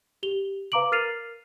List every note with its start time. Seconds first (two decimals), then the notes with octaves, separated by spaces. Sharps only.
0.23 G4 F7 G7
0.72 B4 F5 A#5 D6 D7 F#7
0.92 A#4 F6 A6 C7 D#7 F7